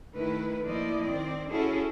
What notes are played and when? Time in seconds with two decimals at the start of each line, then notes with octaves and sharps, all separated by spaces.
0.14 D#3 A3 E4 B4
0.65 F3 A#3 E4 D5 D#5
1.04 D#3 C4 D5
1.51 C#4 E4 F#4 G#4 A4